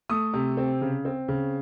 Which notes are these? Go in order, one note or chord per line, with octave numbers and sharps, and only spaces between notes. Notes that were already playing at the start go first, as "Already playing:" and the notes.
A3 D#6
C3
C4
C#3
C4
C#3